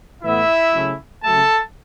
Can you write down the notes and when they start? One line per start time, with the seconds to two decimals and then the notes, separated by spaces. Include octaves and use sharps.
0.22 A2 E3 B3 E4 E5
0.74 C#3 F#3 A3 C#4
1.23 C#3 F#3 A3 A4 A5